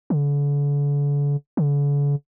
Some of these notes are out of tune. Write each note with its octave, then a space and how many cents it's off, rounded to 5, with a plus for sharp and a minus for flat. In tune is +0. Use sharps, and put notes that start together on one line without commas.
D3 -40
D3 -45